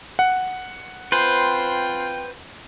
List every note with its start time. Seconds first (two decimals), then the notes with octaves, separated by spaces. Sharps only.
0.19 F#5
1.12 C4 F4 B4 C5 G5